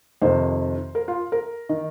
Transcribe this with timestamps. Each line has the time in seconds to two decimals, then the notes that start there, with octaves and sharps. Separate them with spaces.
0.21 F2 C3 D#3 C5
0.95 A#4
1.08 F4
1.32 A#4
1.69 D#3